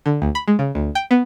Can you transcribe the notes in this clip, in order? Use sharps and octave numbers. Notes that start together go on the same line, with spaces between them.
D3
D2
B5
G#3
C#3
D2
G5
B3